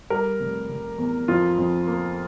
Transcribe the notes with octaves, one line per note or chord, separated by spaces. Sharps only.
G3 A#4
F1
F1
E2
F2 F4
F2
A#3